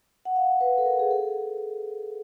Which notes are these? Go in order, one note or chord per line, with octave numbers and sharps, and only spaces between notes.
F#5
F5
B4
A4
A#4
G#4
A4